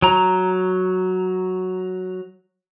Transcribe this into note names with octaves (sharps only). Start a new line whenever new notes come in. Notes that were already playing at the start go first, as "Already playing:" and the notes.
F#3 A#5